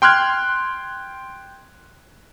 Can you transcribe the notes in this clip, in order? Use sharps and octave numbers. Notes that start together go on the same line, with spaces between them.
G5 C6 F6 F#6 G#6